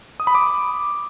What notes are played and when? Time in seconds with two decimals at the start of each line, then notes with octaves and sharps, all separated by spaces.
0.20 D#6
0.27 B5
0.35 D6